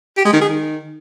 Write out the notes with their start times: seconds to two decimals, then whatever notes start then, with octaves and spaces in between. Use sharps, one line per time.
0.17 G4
0.25 G#3
0.33 D#3
0.41 G#4
0.49 D#3